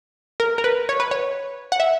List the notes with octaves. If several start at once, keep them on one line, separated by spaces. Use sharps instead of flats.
A#4
A#4
B4
C#5
B4
C#5
F#5
E5